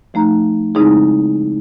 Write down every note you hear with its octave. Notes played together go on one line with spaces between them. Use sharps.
F3 A3 D#4 A#5
C#3 G#3 C4 D#4 E4 G#4